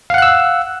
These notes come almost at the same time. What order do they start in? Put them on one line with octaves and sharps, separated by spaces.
F5 F#5 F#6 E6